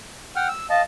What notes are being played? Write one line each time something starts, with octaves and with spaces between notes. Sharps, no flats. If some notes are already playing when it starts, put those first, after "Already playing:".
F#5 G5 F6
E6
D#5 F5 A5